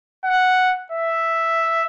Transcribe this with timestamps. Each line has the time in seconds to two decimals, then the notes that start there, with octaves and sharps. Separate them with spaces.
0.25 F#5
0.92 E5